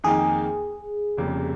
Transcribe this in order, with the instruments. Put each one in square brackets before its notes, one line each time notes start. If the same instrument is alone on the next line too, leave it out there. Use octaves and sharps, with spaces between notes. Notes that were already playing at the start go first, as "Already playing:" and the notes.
[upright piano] F2 D#3 A#3 D#4 [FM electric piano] G#4
[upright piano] F1 F2 C#3 G3 A#3